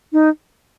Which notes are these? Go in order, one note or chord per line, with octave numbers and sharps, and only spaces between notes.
D#4